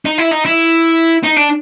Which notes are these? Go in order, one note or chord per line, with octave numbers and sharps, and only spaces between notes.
D#4
E4
D#4
E4
D#4
D4